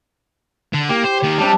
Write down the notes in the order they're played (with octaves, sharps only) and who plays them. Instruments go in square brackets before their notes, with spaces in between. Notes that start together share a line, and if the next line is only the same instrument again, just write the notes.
[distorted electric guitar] D3
[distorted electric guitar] A#3 [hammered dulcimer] G4
[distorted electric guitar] C5
D#3 A#3
[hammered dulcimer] C3 D4 A5 [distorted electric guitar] G3